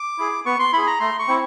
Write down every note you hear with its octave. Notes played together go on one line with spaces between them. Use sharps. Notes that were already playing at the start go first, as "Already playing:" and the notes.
Already playing: D6
E4 G#4
B3 C#6
C6
E4 G#4 B5
A#5
A3 C6
C#6
C4 E4